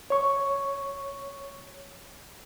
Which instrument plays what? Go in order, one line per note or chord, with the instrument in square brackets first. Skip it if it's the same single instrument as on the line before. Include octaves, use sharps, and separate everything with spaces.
[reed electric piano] C#5 C#6